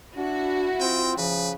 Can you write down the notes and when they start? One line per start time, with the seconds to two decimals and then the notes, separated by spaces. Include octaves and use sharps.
0.16 D4 E4 F#4
0.80 C4 F4 G5
1.18 C#3 F3 B4